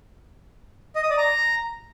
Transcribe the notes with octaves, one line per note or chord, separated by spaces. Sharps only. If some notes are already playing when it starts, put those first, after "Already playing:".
D#5
D#6
D5
A#5